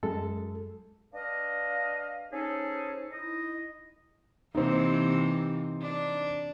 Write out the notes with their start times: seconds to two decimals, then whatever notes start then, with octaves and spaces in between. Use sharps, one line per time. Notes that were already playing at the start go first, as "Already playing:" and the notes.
0.03 F#2 G#3 A4
1.13 D4 B4 D#5 F5
2.32 C#4 D#4 G#4 A4 C5
3.10 D#4 E4 D#5
4.55 C3 E3 A#3 D#4 C5
5.81 D4